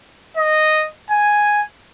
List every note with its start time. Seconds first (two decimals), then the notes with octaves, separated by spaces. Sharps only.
0.37 D#5
1.10 G#5